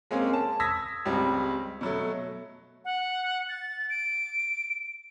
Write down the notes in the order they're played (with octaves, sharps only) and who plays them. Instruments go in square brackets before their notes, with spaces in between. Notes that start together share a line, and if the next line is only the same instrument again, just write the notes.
[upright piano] G#3 A#3 C4 C#4
A5
D#6 E6 G#6 A#6 B6
C#2 G3 C4
B2 F#3 A3
[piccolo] F#5
A6
D7